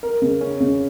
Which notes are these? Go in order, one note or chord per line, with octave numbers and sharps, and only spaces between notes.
A#4
C#3
C#4
C#3